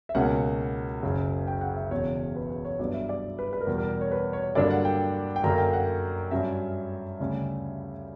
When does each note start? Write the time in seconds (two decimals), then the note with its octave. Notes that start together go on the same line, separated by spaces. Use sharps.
0.09 E5
0.15 C#2 B2 A#3 C#4 F#5
1.03 F#1 F#2 C#3
1.47 G5
1.61 F#5
1.76 E5
1.91 E1 E2 C#3 C#5
2.36 B4
2.50 B4
2.65 C#5
2.79 G2 F#3 B3 D4 D5
2.94 E5
3.09 D5
3.39 B4
3.53 B4
3.61 A#4
3.67 E2 B2 G3
3.78 A#4
4.01 C#5
4.12 B4
4.33 C#5
4.55 G2 D3 F#3 A#3 D4 D5
4.70 F#5
4.85 G5
5.36 G5
5.44 F#2 D3 A#3 A#5
5.58 G5
5.73 F#5
6.31 G2 F#3 C#4 E5
7.20 D2 C#3 G3 C#4